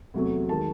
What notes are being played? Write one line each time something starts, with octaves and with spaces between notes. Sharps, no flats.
E2 C3 F#3 A3
D#3 G#3 A5